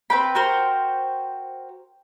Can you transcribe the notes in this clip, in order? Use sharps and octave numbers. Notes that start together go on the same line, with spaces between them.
C4 B4 G5 B5
F#4 A#4 C5